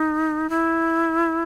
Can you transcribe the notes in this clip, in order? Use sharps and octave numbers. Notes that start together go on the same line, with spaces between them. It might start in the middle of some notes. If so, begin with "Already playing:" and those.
Already playing: D#4
E4